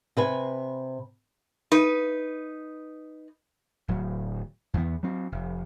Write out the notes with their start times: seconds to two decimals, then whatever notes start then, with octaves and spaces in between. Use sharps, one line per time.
0.17 C3 B4 G#5
1.72 D#4 B4
3.88 D1 F#3
4.74 E2 E3 B3
5.03 F#3 C4
5.32 F1